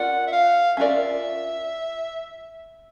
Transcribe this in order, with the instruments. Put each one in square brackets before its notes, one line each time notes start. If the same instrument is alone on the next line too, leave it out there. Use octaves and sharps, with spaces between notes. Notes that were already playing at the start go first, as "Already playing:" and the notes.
Already playing: [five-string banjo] C#4 F4 A#4 D5 [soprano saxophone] F#5
[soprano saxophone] E5
F5
[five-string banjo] C#4 F4 A#4 D5 [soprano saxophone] E5